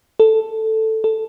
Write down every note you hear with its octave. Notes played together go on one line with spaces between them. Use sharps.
A4
A4